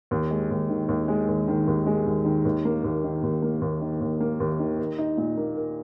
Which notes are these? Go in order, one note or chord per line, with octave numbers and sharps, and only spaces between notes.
D#2
G#3
D#2
D#3
D#2
G#3
D#2
D#3
D#2
G#3
D#2
D#3
D#2
A#3
D#2
D#3
D#2
A#3
D#2
D#3
D#2
A#3
D#2
D#3
A#4
D#4
A#2
A#3
A#4